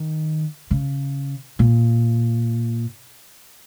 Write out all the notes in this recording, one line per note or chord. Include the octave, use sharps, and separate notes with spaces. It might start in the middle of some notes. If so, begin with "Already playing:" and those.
Already playing: D#3
C#3
A#2